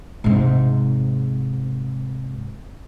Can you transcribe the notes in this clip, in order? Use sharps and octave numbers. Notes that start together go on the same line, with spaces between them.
G#2 C3